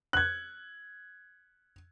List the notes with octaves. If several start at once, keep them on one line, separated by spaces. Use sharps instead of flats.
F#6 G#6